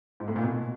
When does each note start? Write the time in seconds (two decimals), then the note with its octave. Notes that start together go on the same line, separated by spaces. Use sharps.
0.20 G#2
0.28 A2
0.36 A#2
0.44 B2